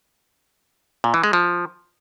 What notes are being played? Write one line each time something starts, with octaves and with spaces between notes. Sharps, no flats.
A#2
E3
G#3
F3